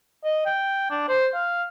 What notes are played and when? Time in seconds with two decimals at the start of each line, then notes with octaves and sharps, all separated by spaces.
0.24 D#5
0.46 G5
0.90 D4
1.09 C5
1.34 F5